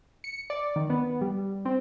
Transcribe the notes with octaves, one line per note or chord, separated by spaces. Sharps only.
C#7
D5
D#3
B3
G3
C4